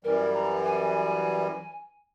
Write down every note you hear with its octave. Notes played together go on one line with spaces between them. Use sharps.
F#2 E3 G3 A#4
A#5
G#5